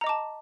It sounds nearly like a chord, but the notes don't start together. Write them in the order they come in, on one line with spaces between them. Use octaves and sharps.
A#5 D#5 D6 A5